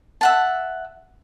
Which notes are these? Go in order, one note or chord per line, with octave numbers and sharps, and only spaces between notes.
E5 F#5 A5